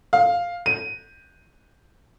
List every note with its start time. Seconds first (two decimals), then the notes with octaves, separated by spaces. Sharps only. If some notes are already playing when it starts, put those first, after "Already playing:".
0.13 F5
0.66 D#7